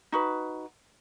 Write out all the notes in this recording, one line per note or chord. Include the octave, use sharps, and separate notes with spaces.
D#4 F#4 B4